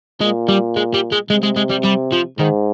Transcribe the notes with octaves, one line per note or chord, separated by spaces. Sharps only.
A#2 G#3
G3
G#3
G3
G#3
C3 G#3
G#3
G#3
G3
G3
F3
G#2 D#3